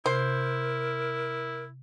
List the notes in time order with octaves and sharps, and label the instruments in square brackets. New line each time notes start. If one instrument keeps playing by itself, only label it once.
[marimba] C3 [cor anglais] E4 [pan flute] A#4 [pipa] C5